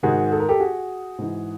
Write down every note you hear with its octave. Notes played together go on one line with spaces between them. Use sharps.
G#2 D#3 F#4 G#4
A4
A#4
G4 A4
F#4 G#4
G#2 E3